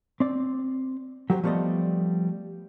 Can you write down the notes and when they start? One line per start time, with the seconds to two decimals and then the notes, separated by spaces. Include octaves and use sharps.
0.20 C4 D5
1.30 F#3 G4 G#4 C5
1.44 F3 G3 A3 B3 D5 D#5